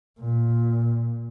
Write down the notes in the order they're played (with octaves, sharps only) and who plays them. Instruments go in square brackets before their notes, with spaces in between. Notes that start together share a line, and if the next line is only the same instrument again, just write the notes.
[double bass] A#2